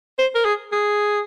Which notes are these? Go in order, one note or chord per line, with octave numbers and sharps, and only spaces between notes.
C5
A#4
G#4
G#4